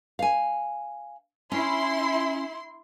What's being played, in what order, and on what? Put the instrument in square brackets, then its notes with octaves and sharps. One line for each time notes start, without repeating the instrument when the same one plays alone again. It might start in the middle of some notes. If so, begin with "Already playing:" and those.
[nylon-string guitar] F5 G#5
[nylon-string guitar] C#4 [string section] E4 C6